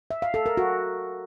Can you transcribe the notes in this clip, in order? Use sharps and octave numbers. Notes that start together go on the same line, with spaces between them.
E5
F5
A4
A#4
F#4